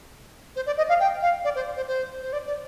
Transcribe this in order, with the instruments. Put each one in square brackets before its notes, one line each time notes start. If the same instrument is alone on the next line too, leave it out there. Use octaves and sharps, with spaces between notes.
[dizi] C5
D5
D#5
F5
G5
F5
D5
C5
C5
C5
C5
D5
D5